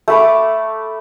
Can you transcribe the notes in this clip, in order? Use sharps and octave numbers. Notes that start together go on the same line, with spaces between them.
A3 B5 D6